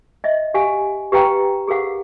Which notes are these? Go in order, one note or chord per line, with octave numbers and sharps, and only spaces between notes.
D#5 E5
G4 F5 G#5
G4 B4 F5 G5 A#5
G4 G#4 A#4 F5 F#5